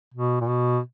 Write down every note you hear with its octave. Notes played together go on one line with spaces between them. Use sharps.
B2
A#2
B2